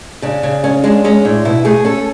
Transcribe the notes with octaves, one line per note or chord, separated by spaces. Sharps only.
C#3 D4
C#3
C#4
G#3 D4
G#3 C#4
A2 D4
B2 E4
A3 G#4
C#4 A4